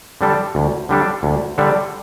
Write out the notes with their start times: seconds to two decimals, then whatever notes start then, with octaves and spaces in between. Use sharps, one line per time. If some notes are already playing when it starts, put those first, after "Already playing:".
0.21 D3 G3 D4 A4
0.55 D2
0.89 D3 G3 D4 A4
1.23 D2
1.58 D3 G3 D4 A4